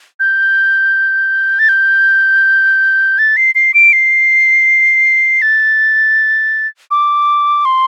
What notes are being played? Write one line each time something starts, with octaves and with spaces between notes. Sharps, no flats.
G6
A6
G6
A6
C7
C7
D7
C7
A6
D6
C6